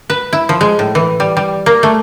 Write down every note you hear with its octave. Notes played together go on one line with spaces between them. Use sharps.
B4
E4
F3
G#3
A2
E3
G3
G3
A#3
A3